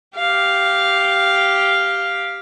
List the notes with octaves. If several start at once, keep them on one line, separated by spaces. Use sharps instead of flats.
G4 F5